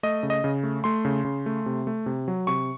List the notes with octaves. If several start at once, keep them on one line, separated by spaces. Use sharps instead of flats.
A3 D#5
C#3
D#5
C#3
A3
A3 C6
C#3
C#3
A3
C3
A3
C3
F#3
C3 C#6